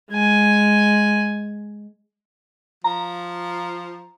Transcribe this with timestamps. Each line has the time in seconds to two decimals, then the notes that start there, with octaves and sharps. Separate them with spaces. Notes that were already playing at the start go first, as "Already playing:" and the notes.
0.11 G#3 G#5
2.84 F3 A#5